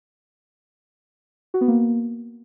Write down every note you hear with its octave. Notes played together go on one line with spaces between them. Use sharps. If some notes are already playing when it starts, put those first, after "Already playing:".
F#4
B3
A#3